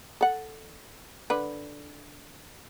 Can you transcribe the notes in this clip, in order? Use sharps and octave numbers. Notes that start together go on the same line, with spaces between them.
A4 F#5
D3 B4